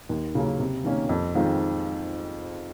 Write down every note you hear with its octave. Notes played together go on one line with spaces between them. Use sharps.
D#2
C#3 F#3 A#3 C#4
C3
D#3 A#3 C#4
F2
D#3 G#3 C4 F4